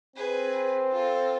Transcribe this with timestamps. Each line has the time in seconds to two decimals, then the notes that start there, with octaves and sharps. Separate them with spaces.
0.16 C4 G#4 B4
0.92 F4 A4